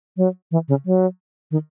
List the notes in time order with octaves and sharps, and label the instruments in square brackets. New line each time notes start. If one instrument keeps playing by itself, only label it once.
[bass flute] F#3
E3
C#3
F#3
D#3